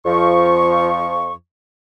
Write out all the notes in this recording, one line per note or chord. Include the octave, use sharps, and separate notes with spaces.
F2 F3 C#6